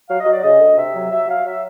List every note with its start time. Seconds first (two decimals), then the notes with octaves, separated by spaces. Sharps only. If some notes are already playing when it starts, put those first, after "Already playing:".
0.08 F#3 F5
0.20 D#5
0.25 F#3
0.31 D5
0.43 C#3 D#5
0.59 D2
0.77 C3 E5
0.94 F#3
1.11 F#3 E5
1.28 F#3 F5
1.45 F#3 E5